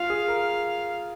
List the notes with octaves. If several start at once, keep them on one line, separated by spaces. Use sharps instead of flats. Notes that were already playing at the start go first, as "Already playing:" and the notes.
Already playing: F4 F5
G#4
A#4